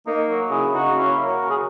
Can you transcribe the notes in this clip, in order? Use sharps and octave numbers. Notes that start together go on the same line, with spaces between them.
A#3 D#4
F#3
C#3 E4 G#4
C#3 D#4 F#4
A#3 C#4 E4
F#3
F#4 A#4
C#3
G#4